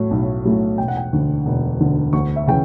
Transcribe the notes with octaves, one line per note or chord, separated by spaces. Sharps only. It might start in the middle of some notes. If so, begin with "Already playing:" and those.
Already playing: A2 F#3 A3
B1
A2 F#3 A3
E1 G5
F#5
G5
D2 D3
E1
D2 D3
D2 C#6
E5
C#3 E3 G5